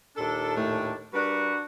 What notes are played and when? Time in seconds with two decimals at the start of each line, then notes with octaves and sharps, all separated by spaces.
0.17 D#2 A#2 D4 A4
0.56 A2 A3
1.13 G3 D4 F#4 A#4 B4